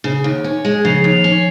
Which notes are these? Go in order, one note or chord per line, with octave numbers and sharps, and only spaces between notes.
C#3
D#2
C#4
G#3
C#3 F3
D#2
C#4